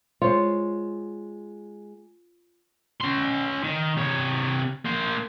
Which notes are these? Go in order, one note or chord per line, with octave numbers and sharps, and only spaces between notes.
G#3 F4 C5 C#5
C#4 C6
D#3
C3 C#5
A#3 C5